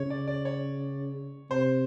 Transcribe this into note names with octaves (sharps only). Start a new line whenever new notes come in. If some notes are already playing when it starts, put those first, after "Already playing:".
Already playing: C#3 C#5
D5
D5
C#5
C3 C5